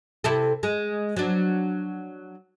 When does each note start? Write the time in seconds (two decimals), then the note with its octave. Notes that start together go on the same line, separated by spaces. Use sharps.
0.24 C3 E4 A4
0.63 G#3
1.17 F#3 D4